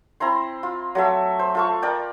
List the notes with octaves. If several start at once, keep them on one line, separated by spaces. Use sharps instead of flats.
C4 E4 A#5 C6
F4
F#3 A3 E5
C5
F4 A4 C#6
A#4 D5 G5